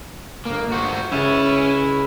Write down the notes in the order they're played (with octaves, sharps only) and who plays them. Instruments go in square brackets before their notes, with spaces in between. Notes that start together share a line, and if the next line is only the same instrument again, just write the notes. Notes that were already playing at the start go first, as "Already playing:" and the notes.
[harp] G1 D#7 E7 [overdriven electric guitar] A#3
[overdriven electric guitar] F#4 C5
[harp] C#2 E5 A6 [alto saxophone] C#4 [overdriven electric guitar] E4